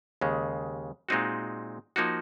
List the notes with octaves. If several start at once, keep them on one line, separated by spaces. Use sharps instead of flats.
D#2 C#3 G#3
A#2 G#3 C4 D#4 F#4
F3 A#3 D#4 F#4